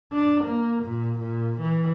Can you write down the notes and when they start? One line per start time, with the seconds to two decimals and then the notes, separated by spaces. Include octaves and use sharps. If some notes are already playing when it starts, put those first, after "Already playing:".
0.13 D4
0.44 A#3
0.84 A#2
1.18 A#2
1.60 E3